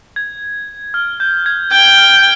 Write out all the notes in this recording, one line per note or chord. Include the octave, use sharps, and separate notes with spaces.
G#6
F6
G6
G#6
G5 G6
F6